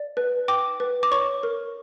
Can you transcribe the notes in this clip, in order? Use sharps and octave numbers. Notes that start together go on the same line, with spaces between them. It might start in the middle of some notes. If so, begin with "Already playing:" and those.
Already playing: D5
B4
G5 D6
B4
D6
C#5 C#6
A#4